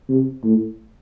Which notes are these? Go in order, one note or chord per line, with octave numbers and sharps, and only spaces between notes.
C3
A2